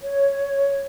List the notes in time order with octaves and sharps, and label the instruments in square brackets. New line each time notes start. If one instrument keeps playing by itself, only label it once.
[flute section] C#5